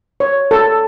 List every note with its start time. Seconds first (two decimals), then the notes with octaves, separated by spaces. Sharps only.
0.20 C#5
0.51 A4